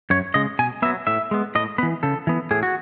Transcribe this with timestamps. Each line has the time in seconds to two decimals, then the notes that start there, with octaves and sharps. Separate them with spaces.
0.10 F#2 C#5
0.34 C#3 G#3 D#5
0.59 B2 G#5
0.82 F#3 B3 E5
1.07 A2 E5
1.31 G#3 B3
1.55 A2 D#5
1.78 E3 B3 B4
2.03 C#3 A4
2.27 E3 B3
2.51 A2 G#4
2.63 F#4